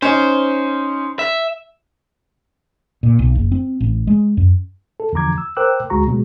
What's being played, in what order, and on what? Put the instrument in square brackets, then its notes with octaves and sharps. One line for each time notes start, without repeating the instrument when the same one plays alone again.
[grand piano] C#4 D#4 [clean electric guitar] C5
[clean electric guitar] E5
[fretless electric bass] A#2
B1
F#1
C4
A1
G#3
F#2
[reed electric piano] A4
E2 D3 F3 A#5 D6 G#6
E6
A#4 C5 G5 D6 E6 F#6
D2 G#3 F#4 A#5 C#6
B2 F#3 G#3